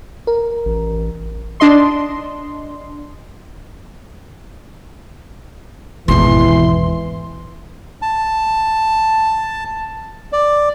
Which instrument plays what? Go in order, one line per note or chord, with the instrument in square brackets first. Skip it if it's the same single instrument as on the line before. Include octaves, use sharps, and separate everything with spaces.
[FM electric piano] A#4
[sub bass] A1
[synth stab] D4 D#5 C6
[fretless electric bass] G#1 E2 [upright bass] B2 [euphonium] E3 [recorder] C6
[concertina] A5
D5